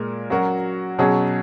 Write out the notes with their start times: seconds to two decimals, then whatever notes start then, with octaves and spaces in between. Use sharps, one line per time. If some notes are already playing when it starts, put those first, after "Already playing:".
Already playing: A#2 G#3 A#4
0.30 F#3 C#4 F#4 A#4
0.98 B2 F#3 C#4 G#4